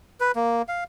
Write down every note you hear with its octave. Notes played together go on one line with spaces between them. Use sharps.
B4
A#3
F5